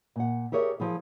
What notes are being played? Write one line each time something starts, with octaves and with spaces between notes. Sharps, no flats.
A#2 F#5
G4 G#4 A#4 C#5 D5 E5
F3 E4 G#4